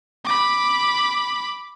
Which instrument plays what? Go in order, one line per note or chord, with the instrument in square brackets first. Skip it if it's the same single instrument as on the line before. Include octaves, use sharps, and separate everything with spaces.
[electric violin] B5 D6